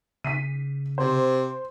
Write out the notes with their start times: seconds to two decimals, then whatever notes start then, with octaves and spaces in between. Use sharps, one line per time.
0.24 C#3 B6 C7 D#7
0.98 C3 C5